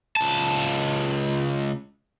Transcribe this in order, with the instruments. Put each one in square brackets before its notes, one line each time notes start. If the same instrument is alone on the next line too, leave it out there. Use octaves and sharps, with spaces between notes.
[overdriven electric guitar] C#2 A5